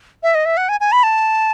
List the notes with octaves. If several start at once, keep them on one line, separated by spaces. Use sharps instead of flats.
E5
D#5
E5
F#5
G#5
G#5
B5
A5